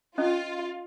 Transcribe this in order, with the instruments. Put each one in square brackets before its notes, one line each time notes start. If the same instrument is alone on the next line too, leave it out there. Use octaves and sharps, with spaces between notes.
[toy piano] C#4 D#5 [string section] F4